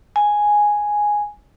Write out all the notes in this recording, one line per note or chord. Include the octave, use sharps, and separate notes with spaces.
G#5